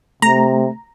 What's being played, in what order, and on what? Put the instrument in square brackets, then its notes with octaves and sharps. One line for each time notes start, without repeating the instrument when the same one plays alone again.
[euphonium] C3 [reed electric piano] A3 [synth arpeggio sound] A#5